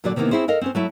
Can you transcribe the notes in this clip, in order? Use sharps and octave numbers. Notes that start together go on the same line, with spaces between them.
A#2 D3 F#3 F#4 D5
C3 D#3 E3 G#3 A#3 B3
C4 C#4 E4 G#4 C5
A4 A#4 D#5 F5
C4 C#4 C5
F#3 A3 E4